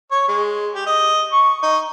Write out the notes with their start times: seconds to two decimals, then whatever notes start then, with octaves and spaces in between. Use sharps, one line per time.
0.11 C#5
0.28 G#3
0.75 G4
0.87 D#5
1.32 C#6
1.63 D#4